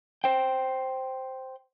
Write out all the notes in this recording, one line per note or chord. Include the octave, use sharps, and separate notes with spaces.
C5 G5